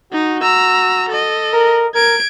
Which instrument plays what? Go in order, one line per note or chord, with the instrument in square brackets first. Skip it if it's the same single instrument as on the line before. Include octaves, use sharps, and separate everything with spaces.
[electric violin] D#4 [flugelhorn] F#4
[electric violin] A#5 E6
A4 D#5
[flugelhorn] A#4
[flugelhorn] A#4 [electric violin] G#6 D7